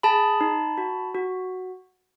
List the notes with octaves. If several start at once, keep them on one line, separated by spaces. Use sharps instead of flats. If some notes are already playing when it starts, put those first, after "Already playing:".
G#4 A5 B5
D#4
F#4
F#4